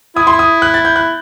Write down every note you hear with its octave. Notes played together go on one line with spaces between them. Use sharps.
E4 D#6
C6
D#6
F#6
A6
G6
F#6